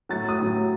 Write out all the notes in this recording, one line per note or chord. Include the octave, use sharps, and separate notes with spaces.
A2 F#3 A6
D#6
A2 F#3